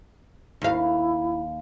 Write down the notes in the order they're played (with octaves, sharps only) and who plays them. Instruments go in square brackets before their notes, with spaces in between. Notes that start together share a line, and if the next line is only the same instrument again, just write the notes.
[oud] D#2 F5 [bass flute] E4